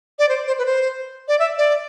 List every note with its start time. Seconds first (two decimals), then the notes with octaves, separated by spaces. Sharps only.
0.19 D5
0.29 C5
0.47 C5
0.58 B4
0.66 C5
1.28 D5
1.39 E5
1.58 D5